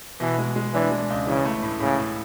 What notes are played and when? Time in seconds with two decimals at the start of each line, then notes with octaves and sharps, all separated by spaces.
0.20 B2 E3
0.38 G#3
0.56 G#3
0.74 E3 D4
0.91 G#3
1.10 C#2
1.27 C#3 E3
1.45 A3
1.62 A2
1.80 A2 C#3
1.98 A2